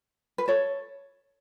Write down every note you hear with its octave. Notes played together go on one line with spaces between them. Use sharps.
B4
A4 C#5